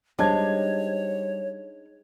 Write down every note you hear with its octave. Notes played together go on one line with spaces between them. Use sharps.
G3 G#3 D4 D#4 C5 C#5 G#6